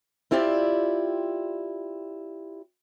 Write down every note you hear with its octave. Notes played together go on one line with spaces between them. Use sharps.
C4 E4 F4 G4 D5